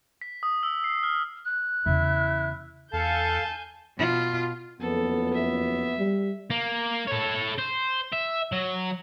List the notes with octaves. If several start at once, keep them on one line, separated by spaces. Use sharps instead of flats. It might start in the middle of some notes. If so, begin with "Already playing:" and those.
B6
D#6
E6
C7
F6
F#6
E2 C#3 E4
E2 A4 F5 G#5 A5 G6
B2 F4
F#1 F2 B3 A4
E5
G3
A#3
A4 C#5
C5
E5
F#3